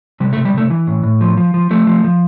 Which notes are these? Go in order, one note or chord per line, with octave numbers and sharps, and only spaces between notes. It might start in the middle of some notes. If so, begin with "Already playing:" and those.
C3 G3
A3
C3
G3
C3 A3
E3
A2
A2
F3
F3
F3
F3 A3
F3
F3